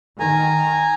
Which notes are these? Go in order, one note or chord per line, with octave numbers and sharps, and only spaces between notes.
D#3 G#5 A#5